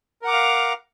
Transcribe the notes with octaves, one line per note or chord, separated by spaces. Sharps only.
A#4 F5 F#5 A#5 D6